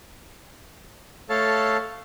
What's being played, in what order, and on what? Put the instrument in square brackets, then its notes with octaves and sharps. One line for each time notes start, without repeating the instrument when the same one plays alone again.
[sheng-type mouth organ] A3 A4 C#5 F5 A5